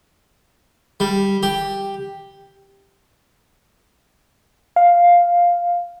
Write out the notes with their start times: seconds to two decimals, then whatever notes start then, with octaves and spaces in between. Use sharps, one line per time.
1.00 G3
1.43 G4
4.76 F5